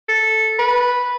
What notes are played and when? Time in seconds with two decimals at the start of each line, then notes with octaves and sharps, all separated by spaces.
0.08 A4
0.59 B4